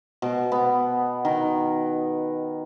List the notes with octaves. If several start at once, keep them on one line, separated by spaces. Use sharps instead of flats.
B2
B3
D#3